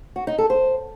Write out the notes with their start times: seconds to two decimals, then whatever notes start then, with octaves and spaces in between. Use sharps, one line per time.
0.16 F#4
0.27 D#4
0.38 A4
0.50 C5